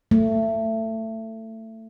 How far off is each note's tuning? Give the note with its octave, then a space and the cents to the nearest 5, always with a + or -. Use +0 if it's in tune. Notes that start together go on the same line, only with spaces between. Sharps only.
A3 +25